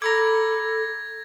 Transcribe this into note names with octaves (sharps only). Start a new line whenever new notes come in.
A4 A#5 B5 D6 G#6 A#6